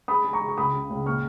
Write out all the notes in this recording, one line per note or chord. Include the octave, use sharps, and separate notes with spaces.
G#3 B5 D#6
G#3
A#5 C#6
G#3
C#6
C#2 B5 D#6
C#3
C#2
A#2 C#6 F6